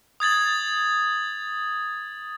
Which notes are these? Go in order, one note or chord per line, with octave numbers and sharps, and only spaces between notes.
D#6 G#6 A6 F#7